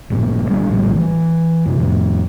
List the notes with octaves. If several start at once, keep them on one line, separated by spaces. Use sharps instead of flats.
A1 G2 A#2
G#1 G3 D4
A#1 A2 E3 G3
E3
F#2 C3
F2 A2